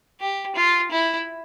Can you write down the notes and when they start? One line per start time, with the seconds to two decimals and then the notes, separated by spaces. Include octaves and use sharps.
0.21 G4
0.56 F4
0.91 E4